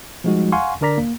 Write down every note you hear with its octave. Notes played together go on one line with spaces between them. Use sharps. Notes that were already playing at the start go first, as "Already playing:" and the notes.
F3 G3 G#3 D#4 F#4
F5 F#5 G#5 C6 C#6
D3 D4 A#4 D5 A#5 B6
A#3